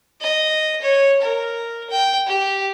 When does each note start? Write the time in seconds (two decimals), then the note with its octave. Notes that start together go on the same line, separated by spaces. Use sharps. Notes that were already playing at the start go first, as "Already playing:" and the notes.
0.21 D#5
0.82 C#5
1.22 A#4
1.90 G5
2.27 G4